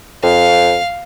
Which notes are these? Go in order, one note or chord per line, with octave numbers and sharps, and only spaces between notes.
F2 F5